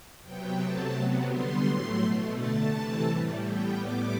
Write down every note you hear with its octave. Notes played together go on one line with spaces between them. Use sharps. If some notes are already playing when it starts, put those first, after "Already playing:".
C3 F#3 B3 G5
C3 F#3 A3 A5
C3 F#3 B3
D3 G3 B3 C6
A2 F#3 A3
B2 A3
D3 A3 A5
C3 E3 A3
A2 E3 G3
A2 G3 B3 G5
A2 G3 B3 D6